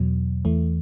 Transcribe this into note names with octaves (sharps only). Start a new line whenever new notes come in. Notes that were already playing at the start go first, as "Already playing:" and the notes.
Already playing: E2 B2 F#3
E2 E3 A3